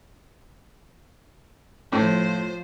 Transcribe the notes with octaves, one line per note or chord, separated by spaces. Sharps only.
A2 F3 C5